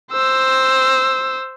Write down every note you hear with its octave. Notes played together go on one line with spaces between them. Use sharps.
C5 E6